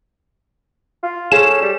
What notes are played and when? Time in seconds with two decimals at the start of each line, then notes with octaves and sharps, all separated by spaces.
1.03 F4
1.32 C#4 G#4 A4 C5 E7
1.62 G3